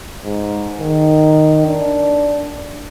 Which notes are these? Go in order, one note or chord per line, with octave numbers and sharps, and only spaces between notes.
G#2
D#3
D4